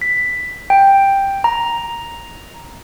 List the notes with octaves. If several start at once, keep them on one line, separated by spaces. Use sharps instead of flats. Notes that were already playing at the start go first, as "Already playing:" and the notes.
B6
G5
A#5